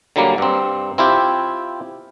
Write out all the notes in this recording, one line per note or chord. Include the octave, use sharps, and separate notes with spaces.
D3 F#3 G3 A#3
G2 C4
C4 E4 F4 G4